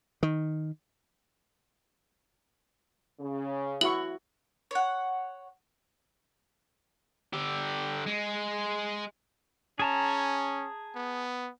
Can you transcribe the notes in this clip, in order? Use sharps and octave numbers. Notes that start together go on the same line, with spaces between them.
D#3
C#3
E4 F#4 C#6 F#7
C#5 F#5
D3 G4
G#3
C#4 G#4 A5 A#5
B3